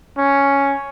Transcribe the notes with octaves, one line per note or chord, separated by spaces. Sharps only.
C#4